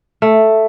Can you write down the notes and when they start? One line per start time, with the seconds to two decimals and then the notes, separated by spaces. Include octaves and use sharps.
0.22 A3